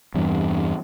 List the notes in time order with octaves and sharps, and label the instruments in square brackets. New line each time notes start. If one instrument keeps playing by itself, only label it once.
[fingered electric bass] E2 G2 E3